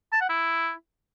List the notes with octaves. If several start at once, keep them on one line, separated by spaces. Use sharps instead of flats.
A5
F#5
E4